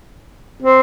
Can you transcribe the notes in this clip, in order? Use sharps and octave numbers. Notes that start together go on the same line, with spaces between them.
C4